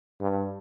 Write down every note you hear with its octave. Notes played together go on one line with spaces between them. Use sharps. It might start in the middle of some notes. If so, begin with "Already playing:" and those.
G2